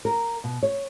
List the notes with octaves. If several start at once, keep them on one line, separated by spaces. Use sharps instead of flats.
A#4
B2
C#5